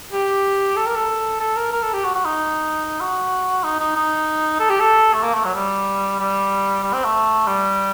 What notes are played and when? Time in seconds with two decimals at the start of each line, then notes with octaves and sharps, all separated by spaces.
0.12 G4
0.76 A4
0.86 A#4
0.95 A4
1.40 A4
1.57 A#4
1.72 A#4
1.83 A4
1.94 G4
2.04 F#4
2.15 F#4
2.25 D#4
3.00 F#4
3.64 D#4
3.80 D#4
3.96 D#4
4.60 A4
4.70 G4
4.80 A4
5.14 A3
5.23 A#3
5.34 A3
5.44 F#3
5.55 G3
6.20 G3
6.83 G3
6.93 C4
7.04 A3
7.47 G3